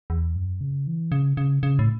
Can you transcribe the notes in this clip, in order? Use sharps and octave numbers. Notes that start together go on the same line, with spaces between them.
E2
F#2
C#3
E3
C#3
C#3
C#3
A2